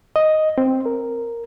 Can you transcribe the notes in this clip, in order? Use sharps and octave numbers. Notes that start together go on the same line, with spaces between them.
D#5
C4
A#4